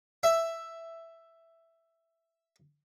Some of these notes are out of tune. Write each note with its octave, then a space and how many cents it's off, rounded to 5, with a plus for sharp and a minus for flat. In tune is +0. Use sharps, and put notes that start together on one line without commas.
E5 +5